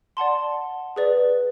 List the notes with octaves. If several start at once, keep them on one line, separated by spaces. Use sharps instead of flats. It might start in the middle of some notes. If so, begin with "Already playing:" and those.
D5 F#5 A5 C6
G#4 B4 D5